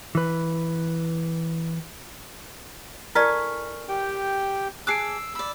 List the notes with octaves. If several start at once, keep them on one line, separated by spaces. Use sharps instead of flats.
E3 B4
E4 A4 A#4 D5 G#5 C#6 F6 B6
G4 G5
G#4 A5 D6 E6 F#6 C7 D7
D5 B5 E6